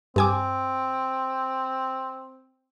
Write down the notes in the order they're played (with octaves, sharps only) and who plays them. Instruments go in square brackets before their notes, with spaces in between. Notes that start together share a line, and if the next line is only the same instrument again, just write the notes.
[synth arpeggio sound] G2 G#5 D6 [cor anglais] C4